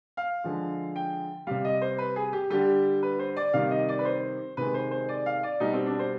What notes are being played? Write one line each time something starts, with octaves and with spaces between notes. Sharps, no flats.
F5
D3 F3 G#3
G5
C3 G3 F5
D#5
C5
B4
G#4
G4
D3 G3 G4
B4
C5
D5
C3 D#3 G3 F5
D#5
D5
B4
C5
C3 D#3 G#3 B4
C5
C5
D5
F5
D5
B2 G3 D#4
C4
D4
C5